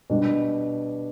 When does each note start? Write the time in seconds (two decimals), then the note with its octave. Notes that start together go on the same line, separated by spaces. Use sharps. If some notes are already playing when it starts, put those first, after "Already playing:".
0.10 B2 G3 D4